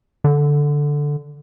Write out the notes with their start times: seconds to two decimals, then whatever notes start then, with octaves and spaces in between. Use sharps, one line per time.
0.24 D3